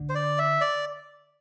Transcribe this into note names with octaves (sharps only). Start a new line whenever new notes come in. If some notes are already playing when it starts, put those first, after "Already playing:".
Already playing: D3
C5
D5
E5
D5